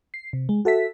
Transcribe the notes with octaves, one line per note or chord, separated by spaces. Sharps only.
C7
C3
G#3
F#4 A4 E5 B6